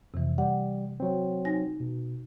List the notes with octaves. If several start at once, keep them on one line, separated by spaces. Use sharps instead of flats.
F2 C3 E3
G3 F#5
F#3 C4
D#4 G#5 A#6
B2